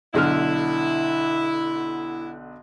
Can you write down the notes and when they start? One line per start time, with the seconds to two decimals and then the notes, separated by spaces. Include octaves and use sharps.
0.14 B1 D3 E4 F6